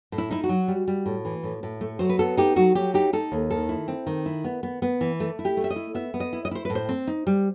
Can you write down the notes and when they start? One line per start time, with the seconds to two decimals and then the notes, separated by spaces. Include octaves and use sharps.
0.12 A2
0.18 E4
0.31 D#4 E4
0.44 F#4
0.49 F#3
0.68 G3
0.88 G3
1.06 A2
1.25 E3
1.43 A2
1.63 A2
1.81 A3
1.99 F#3 C5
2.09 B4
2.19 B3 A4
2.37 D#4 G4
2.56 F#3 F#4
2.75 F#3 G4
2.94 D#4 G4
3.13 D#4 A4
3.32 D#2
3.50 D#3 A4
3.69 E4
3.88 C4
4.07 D#3
4.26 E4
4.44 B3
4.63 B3
4.82 B3
5.01 E3
5.20 A3
5.39 E4
5.45 G4
5.57 A3
5.64 E5
5.70 D#5
5.76 E4
5.95 B3 E5
6.14 B3
6.20 D#5
6.33 E4
6.45 D#5
6.51 E4 C5
6.65 A2 B4
6.75 C5
6.89 C4
7.07 D#4
7.27 G3